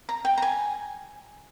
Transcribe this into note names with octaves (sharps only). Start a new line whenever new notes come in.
A#5
G5
A#5
G#5